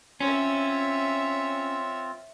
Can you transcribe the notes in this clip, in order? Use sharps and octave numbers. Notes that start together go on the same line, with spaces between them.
C4 C#4 F4 C#5 E5